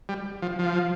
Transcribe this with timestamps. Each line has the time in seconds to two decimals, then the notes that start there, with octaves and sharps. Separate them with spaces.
0.09 G3
0.42 F3
0.59 F3